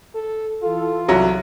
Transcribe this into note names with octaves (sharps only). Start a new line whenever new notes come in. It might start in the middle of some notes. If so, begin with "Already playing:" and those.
A4
E3 F4 A4
C2 F#3